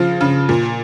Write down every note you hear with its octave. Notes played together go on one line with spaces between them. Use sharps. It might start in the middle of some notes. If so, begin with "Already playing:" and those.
Already playing: C#3 F3 F5
C#3
A#2